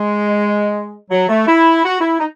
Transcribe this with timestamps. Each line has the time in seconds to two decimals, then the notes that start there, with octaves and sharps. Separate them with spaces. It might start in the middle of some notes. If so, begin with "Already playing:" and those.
Already playing: G#3
1.10 F#3
1.29 A3
1.47 E4
1.84 F#4
2.01 E4
2.20 D#4